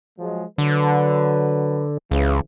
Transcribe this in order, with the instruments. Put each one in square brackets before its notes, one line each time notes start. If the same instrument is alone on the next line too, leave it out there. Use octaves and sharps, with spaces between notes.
[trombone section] F3 F#3 G#3
[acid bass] D3 [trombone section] F#3 B4
[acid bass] C#2 [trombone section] C#3 E3